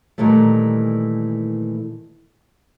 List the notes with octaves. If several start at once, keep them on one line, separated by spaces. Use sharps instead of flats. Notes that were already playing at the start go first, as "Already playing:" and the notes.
A#2 D#3 E3 G3 A3